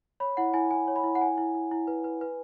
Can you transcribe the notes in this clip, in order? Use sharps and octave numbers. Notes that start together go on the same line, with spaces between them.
C#5 B5
E4 F#5
E4 G#5
E4 G#5
C#5
B5
E4
F#5
E4 G#5
E4
E4
E4
B4
B4
B4